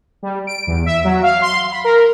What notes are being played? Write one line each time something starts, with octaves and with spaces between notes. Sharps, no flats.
G3
D7
E2
E5
F#3
F5
C6
B5
A#4